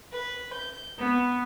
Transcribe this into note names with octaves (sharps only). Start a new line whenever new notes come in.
B4
G6
B3